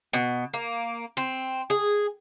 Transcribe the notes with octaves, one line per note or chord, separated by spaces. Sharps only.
B2
A#3
C4
G#4